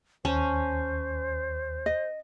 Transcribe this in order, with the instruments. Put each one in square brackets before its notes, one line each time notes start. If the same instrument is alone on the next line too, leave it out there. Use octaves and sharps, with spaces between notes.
[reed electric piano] D#2 [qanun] C#4 [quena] C5 [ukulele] A5
[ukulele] D#5